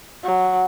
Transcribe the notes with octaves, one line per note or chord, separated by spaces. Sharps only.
F#3